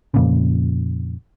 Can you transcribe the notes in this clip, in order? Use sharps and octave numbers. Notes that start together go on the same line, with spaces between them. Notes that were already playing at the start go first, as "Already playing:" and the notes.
F2 A#2 C#3